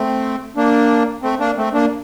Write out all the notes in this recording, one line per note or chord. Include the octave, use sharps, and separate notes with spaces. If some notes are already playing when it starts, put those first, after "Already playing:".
Already playing: A3 C4
A#3 D4
A3 C4
A#3 D4
A3 C4
A#3 D4